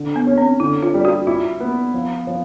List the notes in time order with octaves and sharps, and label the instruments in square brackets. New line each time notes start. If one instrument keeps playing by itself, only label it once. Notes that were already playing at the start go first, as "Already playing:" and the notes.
Already playing: [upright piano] D3
[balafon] B3
[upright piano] C#4
[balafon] C4
[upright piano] D3 [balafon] E4
[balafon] F4
[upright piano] G3
[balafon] F#4
[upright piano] E4 [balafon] F4
[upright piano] B3
F3
F3